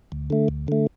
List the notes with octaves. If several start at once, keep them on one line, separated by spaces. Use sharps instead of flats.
D2
D3 A3
D2
D3 A3